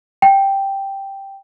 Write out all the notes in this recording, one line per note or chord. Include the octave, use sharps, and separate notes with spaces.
G5